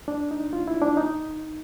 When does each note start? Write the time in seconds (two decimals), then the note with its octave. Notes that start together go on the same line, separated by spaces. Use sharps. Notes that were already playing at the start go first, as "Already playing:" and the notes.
0.08 D4
0.31 D#4
0.53 F4
0.68 E4
0.82 D4
0.97 D#4